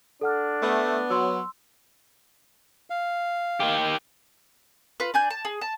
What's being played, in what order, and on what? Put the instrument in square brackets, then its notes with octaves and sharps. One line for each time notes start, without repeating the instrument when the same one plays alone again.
[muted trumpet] D4 [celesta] A4 F#5 F6
[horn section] A3 [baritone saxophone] B3
[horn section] F#3 [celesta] C6 E6
[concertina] F5
[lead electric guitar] D#3 G4
[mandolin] F4 B4
D4 G#5 G6
A5
G#4
A5